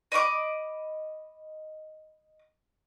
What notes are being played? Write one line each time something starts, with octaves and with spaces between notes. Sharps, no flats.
D#5 B5 C#6 D6